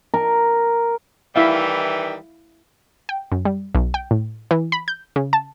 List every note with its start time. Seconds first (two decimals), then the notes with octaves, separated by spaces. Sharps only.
0.14 A#4
1.36 D#3 E3 G3 E4 E5 F5
3.09 G5
3.32 F#2
3.45 G3
3.75 B1
3.94 G5
4.11 A2
4.51 E3
4.72 B5
4.88 G6
5.16 C#3
5.33 A5